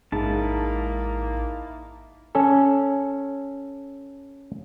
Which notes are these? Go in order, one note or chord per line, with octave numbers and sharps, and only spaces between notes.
A1 G#2 A#3 D#4 E4 A5
C#4 A4